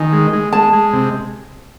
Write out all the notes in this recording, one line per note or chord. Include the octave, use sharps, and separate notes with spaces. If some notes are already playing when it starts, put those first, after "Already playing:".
Already playing: D#3 G#5
G#3
G#3
G#3 A5
G#3
C3